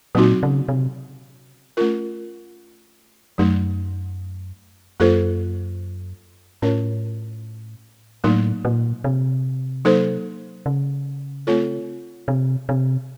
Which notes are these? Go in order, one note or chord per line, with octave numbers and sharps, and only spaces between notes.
A#2 F#3 C4 D#4 F#4
C#3
C3
A3 C#4 F4 A#4
F#2 F#3 A3 D#4
F#2 A#3 F4 A4 C5
A2 C#4 F4 A#4 C#5
A2 F#3 A#3 D#4
A#2
C3
F#3 A#3 D#4 A4 C5
C#3
A3 C4 F4 A4 C#5
C3
C3